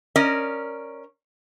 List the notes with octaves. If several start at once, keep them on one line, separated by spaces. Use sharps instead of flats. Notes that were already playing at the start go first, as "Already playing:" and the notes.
C#4 A#4 D5 D#5